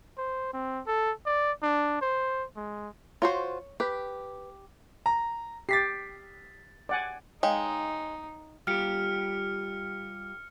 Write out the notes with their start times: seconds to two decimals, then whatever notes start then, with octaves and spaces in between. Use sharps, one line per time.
0.17 C5
0.53 C4
0.87 A4
1.26 D5
1.62 D4
2.01 C5
2.56 G#3
3.22 F4 F#4 C5 C#5
3.80 G4 B4
5.06 A#5
5.69 G4 A6 B6 C7
6.89 D5 F#5 G#5
7.43 G#3 D#4 C#5 F5 G5
8.67 G3 F4 G4 F6 C#7